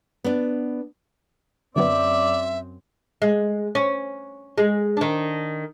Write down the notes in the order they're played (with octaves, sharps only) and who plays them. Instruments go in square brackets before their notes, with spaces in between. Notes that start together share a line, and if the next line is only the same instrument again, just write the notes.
[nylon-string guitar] B3 D4
[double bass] F#2 C4 [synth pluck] D3 F#3 B3 [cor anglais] D5 [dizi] E5
[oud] G#3
C#4
G#3
D#3 D4